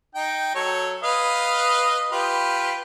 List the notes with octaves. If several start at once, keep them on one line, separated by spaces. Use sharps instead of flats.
D#4 G5
F#3 A4 C#5
B4 D#5 F5
F4 G4 B4